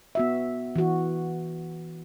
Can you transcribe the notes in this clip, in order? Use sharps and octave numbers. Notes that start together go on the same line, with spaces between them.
B3 F#4 E5
E3 F#4